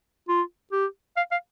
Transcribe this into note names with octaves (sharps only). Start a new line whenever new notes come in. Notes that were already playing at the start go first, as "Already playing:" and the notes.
F4
G4
F5
F5